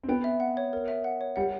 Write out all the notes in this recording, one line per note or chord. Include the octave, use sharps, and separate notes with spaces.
C4
B3 G5
E5
F#5
C#5
A#4
E5
F#5
C#5
G3 F#5